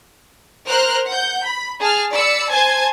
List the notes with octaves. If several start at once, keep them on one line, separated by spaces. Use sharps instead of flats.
A#4 C5 F6 F#6
F#5 G6
B5
G#4 A5 F6
D5 B5 E6 C#7
C5 G#5 A5 G#6